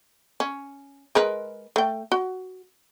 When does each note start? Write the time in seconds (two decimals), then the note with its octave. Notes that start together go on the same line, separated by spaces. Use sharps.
0.40 C#4
1.15 G#3 A#4 B4
1.76 A3 G5
2.12 F#4